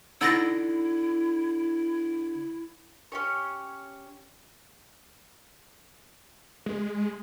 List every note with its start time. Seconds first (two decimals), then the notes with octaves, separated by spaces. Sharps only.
0.21 D3 D#4 E4 F#5 E6 A6 A#6
3.12 C#4 G4 C#5
6.66 G#3